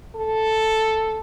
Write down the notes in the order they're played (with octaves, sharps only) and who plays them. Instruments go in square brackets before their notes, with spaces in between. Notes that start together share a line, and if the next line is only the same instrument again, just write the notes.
[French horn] A4